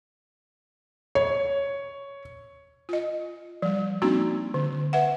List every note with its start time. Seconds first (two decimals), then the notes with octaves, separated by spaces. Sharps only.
1.15 C#5
2.89 F4 D#5
3.62 F3 G3
4.02 A#3 C4 D4 D#4 F#4
4.54 D3
4.93 B4 E5 F#5